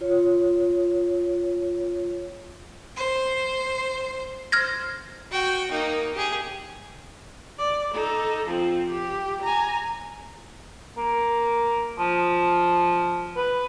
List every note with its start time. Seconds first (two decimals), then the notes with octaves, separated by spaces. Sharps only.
0.01 F4 C#5
2.97 C5
4.52 C5 F6 G#6 A#6
5.31 F#4 G5
5.71 A#3 D#4
6.14 G4 G#4
7.58 D5
7.93 D#4 A4
8.46 F3 C4
8.90 G4
9.42 G#5 A#5
10.98 A#3
11.99 F3
13.36 B4